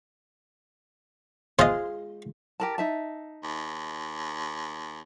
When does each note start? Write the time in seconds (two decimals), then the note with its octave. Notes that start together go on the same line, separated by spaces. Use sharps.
1.59 G#3 F4 G#4 C5 D#5
2.60 G4 A#4 A5
2.78 D#4 E5 A5
3.43 D#2